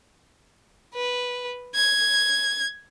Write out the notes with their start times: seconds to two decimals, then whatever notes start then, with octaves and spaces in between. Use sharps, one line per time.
0.94 B4
1.75 G#6